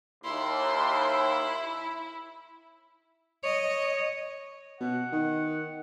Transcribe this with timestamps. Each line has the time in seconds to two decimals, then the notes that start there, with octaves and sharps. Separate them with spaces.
0.25 D#2 E4 C6
3.43 C#5 D#5
4.80 B2 F#5
5.13 D#3